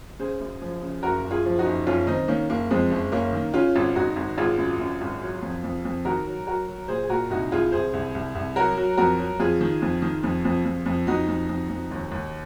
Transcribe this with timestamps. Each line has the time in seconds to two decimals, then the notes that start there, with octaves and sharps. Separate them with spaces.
0.19 C#3 G#4 C5
0.40 F#2
0.62 F3
0.83 C#3
1.03 F#1 F#4 A#4
1.25 F#1
1.31 F4 G#4
1.45 F3
1.59 D#4 F#4
1.66 F#1
1.87 F#1 C#4 F4
2.07 D#3 C4 D#4
2.28 D#3 A#3 C#4
2.50 F#1 A#3
2.71 F2 G#3 C4
2.91 F#1
3.12 F#1 A#3 C#4
3.33 D#3
3.53 C#3 C#4 F4
3.76 G#1
3.95 G#1 D#4 F#4
4.16 G#1
4.38 G#1 F4 G#4
4.58 F#2
4.79 F#2
5.01 G#1
5.22 F#3
5.42 F2
5.64 F2
5.85 F2
6.05 D#3 F#4 A#4
6.27 F#3
6.47 F#3 F#4 A#4
6.67 F#3
6.88 A#2 G#4 C5
7.03 G#4
7.10 A#2 F#4 A#4
7.30 C2 D#4 F#4
7.51 C2 F4 G#4
7.72 C2 G#4 C5
7.93 C2
8.15 C2
8.35 C2
8.56 F#3 F#4 A#4
8.77 F#3
8.97 F2 F#4 A#4
9.18 F#3
9.39 F2 F4 G#4
9.61 D#3
9.82 F2
10.02 D#3
10.23 F2
10.45 F2
10.65 F2
10.86 F2
11.07 F2 D#4 F#4
11.28 F2
11.49 F2
11.69 F2
11.91 D#2
12.12 D#2